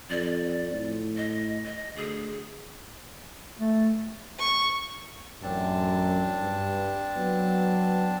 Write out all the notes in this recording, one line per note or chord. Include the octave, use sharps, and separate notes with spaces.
F2 D5
A2
D#5
D#5
D2 G#4
A3
C#6
A1 F#2 C4 D4 A5
G2
F#3 B3